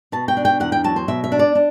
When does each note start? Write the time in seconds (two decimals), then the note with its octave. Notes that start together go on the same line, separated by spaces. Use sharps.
0.12 B2 A5
0.28 G5
0.37 D4
0.45 G5
0.60 E2 F#5
0.72 G5
0.84 F#3 A5
0.96 C5
1.08 B2 E5
1.24 E5
1.32 D4
1.39 D5
1.55 D4